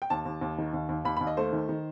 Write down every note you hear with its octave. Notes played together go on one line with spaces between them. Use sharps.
G5
D#2 A5
D#2
D#2
D#3
D#2
D#2
D#2 B5
D#2 B5
D#5
A3 C5
D#3
D#3